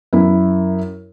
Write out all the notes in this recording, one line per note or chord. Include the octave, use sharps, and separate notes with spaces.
F#2 E4